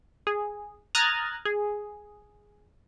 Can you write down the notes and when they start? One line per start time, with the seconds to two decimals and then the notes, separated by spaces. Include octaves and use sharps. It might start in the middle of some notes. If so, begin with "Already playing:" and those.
0.27 G#4
0.95 A#5 D#6 F6 F#6 G#6 A6
1.45 G#4